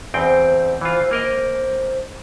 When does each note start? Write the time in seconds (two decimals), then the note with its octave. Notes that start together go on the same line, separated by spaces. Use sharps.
0.14 E2 C4 C5 G5
0.81 E3 F4 C5
1.11 A#3 A#4 C5 D#5